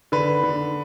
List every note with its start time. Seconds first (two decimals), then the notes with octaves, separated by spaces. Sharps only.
0.12 D3 B4
0.43 D3